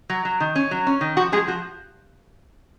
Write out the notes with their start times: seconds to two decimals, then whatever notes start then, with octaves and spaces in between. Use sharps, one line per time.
0.10 F#3
0.25 F#3
0.40 D#3
0.56 C#4
0.71 F#3
0.87 C#4
1.01 D#3
1.17 F3 F#4
1.32 F3 G#3 G#4
1.47 F3 F#4